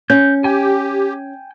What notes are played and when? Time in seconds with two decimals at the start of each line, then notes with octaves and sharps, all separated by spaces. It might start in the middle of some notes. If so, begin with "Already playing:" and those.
0.10 C#4 G6
0.44 G4 G5 G#5